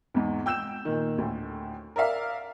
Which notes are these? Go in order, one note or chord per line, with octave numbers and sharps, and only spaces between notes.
E2 G#2
G5 E6 G6 E7
A#2 D#3
D2 A2
A#4 D5 E5 F5